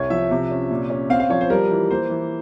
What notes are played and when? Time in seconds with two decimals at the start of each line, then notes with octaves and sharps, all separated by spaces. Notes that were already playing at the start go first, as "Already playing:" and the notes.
Already playing: C2 C#5
0.10 F3 E5
0.31 C3
0.51 C#4
0.70 A#2
0.90 C#4
1.10 C4 F5
1.20 F5
1.30 F3 C#5
1.41 C5
1.50 G3 A#4
1.70 E3
1.91 A#3 C5
2.10 E3